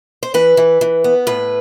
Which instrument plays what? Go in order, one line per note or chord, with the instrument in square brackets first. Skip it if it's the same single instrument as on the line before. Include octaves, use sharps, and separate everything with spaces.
[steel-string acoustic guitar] C5
E3 B4
E3
E3
B3
A2 B4